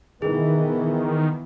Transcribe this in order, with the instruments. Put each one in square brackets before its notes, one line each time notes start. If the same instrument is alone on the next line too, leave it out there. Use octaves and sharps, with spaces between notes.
[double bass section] B2 E3 B3 [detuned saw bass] D#3 [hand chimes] G#4